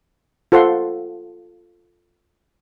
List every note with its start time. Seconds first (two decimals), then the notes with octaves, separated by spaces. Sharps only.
0.52 F4 A4 C5 F#5 C6